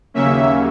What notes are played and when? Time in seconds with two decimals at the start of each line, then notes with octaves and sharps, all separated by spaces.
0.14 D#2 C#3 F#3 A#3 C#4 E5